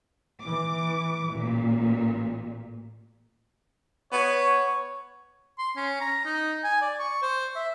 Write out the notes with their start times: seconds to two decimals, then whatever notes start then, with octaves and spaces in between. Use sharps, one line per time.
0.43 E3 D6
1.32 A1 A#2
4.12 B3 C#5
5.59 C6
5.76 C#4
6.01 A#5
6.25 D#4
6.64 G#5
6.81 D5
6.99 C#6
7.22 C5
7.56 E5